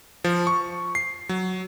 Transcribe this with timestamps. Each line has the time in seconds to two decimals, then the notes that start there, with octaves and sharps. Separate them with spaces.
0.24 F3
0.47 C#6
0.95 C7
1.29 F#3